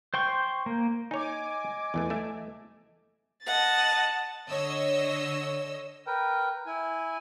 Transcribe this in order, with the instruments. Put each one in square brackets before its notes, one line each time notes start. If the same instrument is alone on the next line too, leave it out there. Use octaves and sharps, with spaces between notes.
[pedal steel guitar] C5 G5 C6 C#6
A#3
[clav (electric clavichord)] D#4 C#5 [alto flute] D#5 [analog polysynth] G#5 D6
[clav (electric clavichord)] E2 E3 A3
A3 E5
[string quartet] D#5 F#5 [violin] A5 A6
[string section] D3 C#5 D#5 E6
[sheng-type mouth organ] A#4 B4 G5
E4 G#5